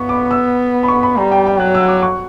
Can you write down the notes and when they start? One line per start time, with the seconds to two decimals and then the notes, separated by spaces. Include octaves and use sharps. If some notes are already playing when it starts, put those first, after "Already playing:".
Already playing: B3 B5 C#6
0.09 D6
0.31 E6
0.83 B5
0.88 C#6
1.03 B5
1.17 G3 A#5
1.31 G5
1.46 G5
1.60 F#3 F#6
1.75 E6
1.88 D6
2.03 C#6